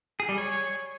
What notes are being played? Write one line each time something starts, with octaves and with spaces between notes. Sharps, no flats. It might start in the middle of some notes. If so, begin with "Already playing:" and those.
G#4
G3
C#5